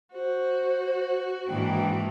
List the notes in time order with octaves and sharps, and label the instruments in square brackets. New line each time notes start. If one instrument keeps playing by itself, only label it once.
[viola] F#4 [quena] C5
[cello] G#2 D#3 [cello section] E3 A#3 D4 [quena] G5